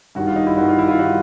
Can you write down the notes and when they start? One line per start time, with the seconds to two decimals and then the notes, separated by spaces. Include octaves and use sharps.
0.15 G2 D#3 G3 F#4
0.27 F4
0.36 D#4
0.47 E4
0.57 G2 D#3 G3 F#4
0.69 F4
0.79 E4
0.88 F4
0.99 D#3 G3 F#4